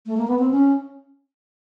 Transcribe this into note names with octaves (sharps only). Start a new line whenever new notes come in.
A3
A#3
B3
C4
C#4